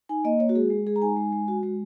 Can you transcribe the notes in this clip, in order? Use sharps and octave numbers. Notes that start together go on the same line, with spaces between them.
D#4 G#5
A#3 D#5
A#3 C#5
F#4
G#3 G#4
G#3
G#3 G#4
A#5
D#4 G#5
G#3
G#3
F#4
G#3